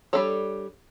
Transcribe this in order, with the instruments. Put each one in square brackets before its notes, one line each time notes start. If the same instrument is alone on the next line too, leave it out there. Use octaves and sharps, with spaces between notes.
[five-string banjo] G3 D4 A4 C#5